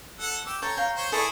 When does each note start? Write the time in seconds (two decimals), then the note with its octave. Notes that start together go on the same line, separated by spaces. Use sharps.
0.20 A4 F#5
0.46 G4 D6 E6
0.62 A4 C#5 G5 A#5
0.77 F5 G5 A#5
0.97 C5 C#5
1.12 E4 G#4 A4 C#5 D5